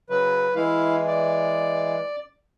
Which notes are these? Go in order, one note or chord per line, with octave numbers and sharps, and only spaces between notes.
C#3 F#3 B4
E3 G#3 E4 F5
D5